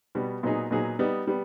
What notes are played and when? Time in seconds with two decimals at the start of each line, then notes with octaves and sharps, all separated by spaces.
0.15 B2 G3 B3
0.43 A#2 F#3 B3 D#4 G#4
0.71 A#2 F#3 B3 D#4 G#4
0.99 G3 B3 D#4
1.27 G3 B3